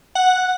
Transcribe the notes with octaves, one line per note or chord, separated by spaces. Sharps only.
F#5